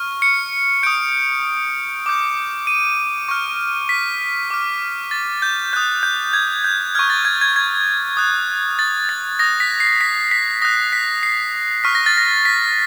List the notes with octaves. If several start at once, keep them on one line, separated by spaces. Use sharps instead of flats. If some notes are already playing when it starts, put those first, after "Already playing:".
Already playing: C#6 F6
C#7
D#6 G6 D7
D6 G6
D#7
C#6 F6
B6
D6 F6
A6
G6
D#6 F#6 G6
G6
G#6
G6
C#6 F6 G#6
A6
G#6
G#6
G#6
D#6 F#6
A6
A6
D#6 F#6 A#6
B6
C7
B6
B6
D#6 F#6 A#6
B6
C7
C#6 F6 B6
A#6
A6
A#6
B6